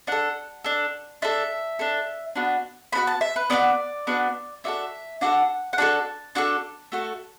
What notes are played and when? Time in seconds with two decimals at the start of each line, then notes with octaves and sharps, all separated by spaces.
0.07 D4 A4 F#5
0.64 D4 A4
1.22 D4 A4 E5
1.79 D4 A4
2.36 B3 D4 F#4
2.92 B3 D4 F#4 B5
3.07 A5
3.21 E5
3.36 B4
3.50 B3 D4 F#4 D5
4.07 B3 D4 F#4
4.64 D4 F#4 A4 E5
5.21 D4 F#4 A4 F#5
5.73 F#5
5.78 D4 F#4 A4 A5
6.35 D4 F#4 A4
6.92 A3 F#4 A4